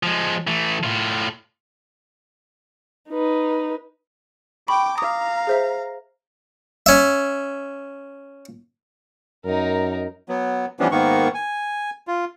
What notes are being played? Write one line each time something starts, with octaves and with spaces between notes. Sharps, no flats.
F3 G#3
E3 A3
A2 F4
D#4 B4
G5 B5 C#6 D6
F5 A#5 D6 D#6
G#4 C5 E5
C#4 E5
F#2 D#4 A#4
F#3 B3
E3 F3 G3 B3 C#4 D4
G#2 D#3 A#3 B3 C#6
G#5
F4